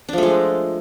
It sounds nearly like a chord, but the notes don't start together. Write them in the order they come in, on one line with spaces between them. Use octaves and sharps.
D4 F3 A3 G#3